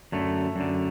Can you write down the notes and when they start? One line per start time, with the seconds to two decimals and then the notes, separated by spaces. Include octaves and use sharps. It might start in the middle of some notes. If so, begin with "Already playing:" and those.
0.12 F#2 D3 A3
0.56 F#2 D3